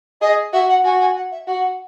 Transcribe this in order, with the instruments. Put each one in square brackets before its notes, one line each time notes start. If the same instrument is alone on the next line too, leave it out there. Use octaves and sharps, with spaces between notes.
[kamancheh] G#4 [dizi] D#5
[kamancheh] F#4 [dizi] E5
[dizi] F#5
[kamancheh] F#4 [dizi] G#5
[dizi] G#5
F#5
E5
[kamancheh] F#4 [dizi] F#5